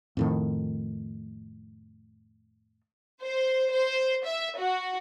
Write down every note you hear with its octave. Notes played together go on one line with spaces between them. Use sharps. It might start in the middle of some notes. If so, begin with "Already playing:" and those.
F2 A2 D#3
C5
C5
E5
F#4